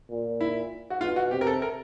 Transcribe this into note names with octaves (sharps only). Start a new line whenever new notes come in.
A#2
E4
F#4
B2 F4
F#4
C3 G4
A#4
A4
A#4